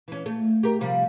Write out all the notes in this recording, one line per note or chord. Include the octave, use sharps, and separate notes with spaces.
E3 C#4
A3
G4 A#4
C3 F3 G3